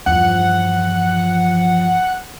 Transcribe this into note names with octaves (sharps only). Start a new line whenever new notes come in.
E2 G2 F3 F#5